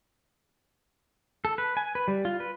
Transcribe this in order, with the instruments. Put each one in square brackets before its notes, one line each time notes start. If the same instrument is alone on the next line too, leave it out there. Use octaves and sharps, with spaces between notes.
[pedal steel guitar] A4
B4
G#5
B4
G3
F4
B4